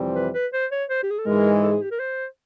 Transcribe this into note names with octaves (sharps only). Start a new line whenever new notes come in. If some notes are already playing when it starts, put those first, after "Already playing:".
Already playing: F2 C3 E3 G3 C4
B4
B4
C5
C#5
C5
G4
G#4
A4
G#2 E3 G#3 A#4
A4
G#4
G4
A#4
C5